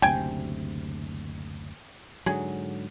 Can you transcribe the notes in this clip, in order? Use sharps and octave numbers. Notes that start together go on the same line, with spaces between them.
F#1 D2 C3 G5 G#5
G#2 D3 F#3 G#4